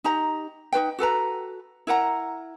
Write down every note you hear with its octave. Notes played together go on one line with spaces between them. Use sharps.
D#4 G4 A#5
D#4 F#4 B4 G5
F#4 A4 B4 A#5
E4 A#4 F#5 A#5